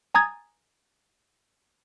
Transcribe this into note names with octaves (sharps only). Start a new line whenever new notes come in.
G#5 A#5 D#6 G#6 A6